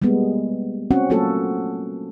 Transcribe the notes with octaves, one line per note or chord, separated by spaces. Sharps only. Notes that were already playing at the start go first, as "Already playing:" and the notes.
G3 G#3 A#3 B3
C4 C#4 F#4 F#5
F#3 A3 A#3 F4 F#4 A4